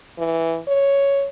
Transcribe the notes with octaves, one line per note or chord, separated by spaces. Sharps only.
E3
C#5